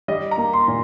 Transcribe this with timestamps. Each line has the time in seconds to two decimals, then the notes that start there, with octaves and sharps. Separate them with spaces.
0.08 G3 D#5
0.31 A#5
0.38 A#3
0.53 C6
0.68 A#2